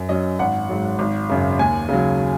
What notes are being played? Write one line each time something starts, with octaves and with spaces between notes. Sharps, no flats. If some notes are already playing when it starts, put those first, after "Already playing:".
Already playing: F#2
F#3 C#4 D#5
G#1 F#5
G#2 F#3
G#1
F#2 C#3
D#2 G#5
C#3 F#3